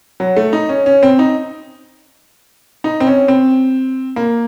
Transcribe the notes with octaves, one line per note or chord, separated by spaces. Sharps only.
F#3
A3
D#4
C#4
C#4
C4
D#4
D#4
C4
C#4
C4
A#3